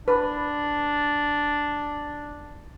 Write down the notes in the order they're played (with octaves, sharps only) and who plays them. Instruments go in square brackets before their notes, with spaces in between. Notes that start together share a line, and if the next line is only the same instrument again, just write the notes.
[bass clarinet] D4 [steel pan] B4